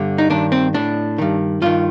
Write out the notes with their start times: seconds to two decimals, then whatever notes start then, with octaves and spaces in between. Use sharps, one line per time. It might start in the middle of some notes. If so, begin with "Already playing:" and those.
Already playing: G2 D3
0.18 D#4
0.30 G2 D#3 D4
0.52 C4
0.74 A2 D4
1.18 G2 D#3
1.62 G2 D#3 F4